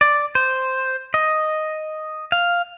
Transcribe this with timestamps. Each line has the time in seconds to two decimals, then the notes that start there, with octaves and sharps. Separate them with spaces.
0.01 D5
0.35 C5
1.14 D#5
2.32 F5